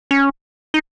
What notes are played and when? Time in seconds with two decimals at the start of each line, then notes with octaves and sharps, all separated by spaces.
0.11 C#4
0.74 D#4